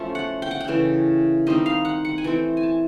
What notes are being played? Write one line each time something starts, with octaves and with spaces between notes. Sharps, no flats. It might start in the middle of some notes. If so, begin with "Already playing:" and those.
Already playing: F3 A3 C#4
F#5
G5
F#5
G5
C#3 E3 A3
D#3 G3 C4 D#4 D#5
F5
F#5
F#5
G#5
E3 A3 C4 G5
G#5
A5